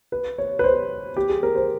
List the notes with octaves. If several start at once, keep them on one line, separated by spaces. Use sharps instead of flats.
B4
C#5
B4
C5
G4
G#4
A#4
C5